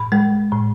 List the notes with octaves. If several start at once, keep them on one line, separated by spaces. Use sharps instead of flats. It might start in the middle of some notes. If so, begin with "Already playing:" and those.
Already playing: A2 B5
G#3
A2